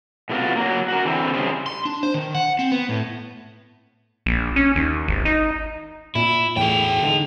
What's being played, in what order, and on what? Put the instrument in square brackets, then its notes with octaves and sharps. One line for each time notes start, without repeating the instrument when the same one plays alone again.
[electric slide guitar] A2 C3 A3 B3 F4 F#4
F#3 A#3
F#4 A#4
D3 E3 C4
C#3 G3 A3 G#4 C5
[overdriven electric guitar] C6
D4
C5
D#3
F#5
C4
B3
A2
[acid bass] A#1
C#4
D#2
G#1
D#4
[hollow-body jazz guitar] A#2 [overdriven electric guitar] E4
[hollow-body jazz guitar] E2 A2 [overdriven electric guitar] G#4 G5
[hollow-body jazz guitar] D3 G#3 D#4